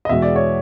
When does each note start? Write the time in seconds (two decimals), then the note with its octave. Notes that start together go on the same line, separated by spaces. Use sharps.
0.05 D#5
0.09 E2 B2 G#3 E5
0.22 D5
0.36 C#5